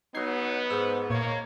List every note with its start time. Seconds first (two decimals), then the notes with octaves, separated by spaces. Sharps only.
0.15 F#3 B3 C#4 D#4 G#6 C7
0.70 G#2 E6
1.10 A#2 A#3 C#5